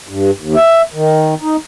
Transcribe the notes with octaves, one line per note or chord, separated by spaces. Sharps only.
G2
D#2
E5
D#3
D#4